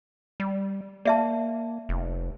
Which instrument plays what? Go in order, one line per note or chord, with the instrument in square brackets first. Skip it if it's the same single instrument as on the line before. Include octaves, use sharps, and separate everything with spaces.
[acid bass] G3
[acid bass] A#3 [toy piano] D5 E5 A5
[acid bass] F1